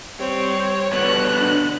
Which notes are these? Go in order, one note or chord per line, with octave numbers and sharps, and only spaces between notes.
G3 C4 C#5
B2 D3 B3 F#6
D4